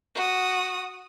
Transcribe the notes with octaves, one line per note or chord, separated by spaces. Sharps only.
F#4 D#6